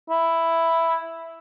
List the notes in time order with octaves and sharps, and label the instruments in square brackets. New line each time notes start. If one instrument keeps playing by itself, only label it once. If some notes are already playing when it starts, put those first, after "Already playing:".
[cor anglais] E4